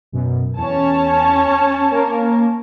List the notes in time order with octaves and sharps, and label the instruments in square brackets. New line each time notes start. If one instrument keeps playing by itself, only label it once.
[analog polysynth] F#2 B2
[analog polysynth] E2 [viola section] C#4 C#5 A5
[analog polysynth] A#3 A#4